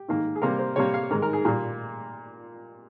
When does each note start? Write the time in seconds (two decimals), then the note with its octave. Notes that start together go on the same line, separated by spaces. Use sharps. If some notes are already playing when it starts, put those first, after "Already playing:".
Already playing: G4
0.08 G#2 D#3 A#3
0.36 G#4
0.42 C3 G3 A#3 A#4
0.59 C5
0.76 C3 G3 A#3 C#5
0.94 F5
1.10 G#2 D#3 G#3 A#4
1.22 A#4
1.33 G#4
1.45 A#2 G3 A#3